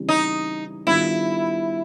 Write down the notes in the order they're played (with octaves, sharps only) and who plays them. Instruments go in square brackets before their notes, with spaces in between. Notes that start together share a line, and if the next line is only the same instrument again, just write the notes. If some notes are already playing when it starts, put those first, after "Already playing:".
Already playing: [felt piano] C#3 E3 G3 C4
[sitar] D#4
[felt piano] D#3 G3 B3 D4 F4 [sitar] E4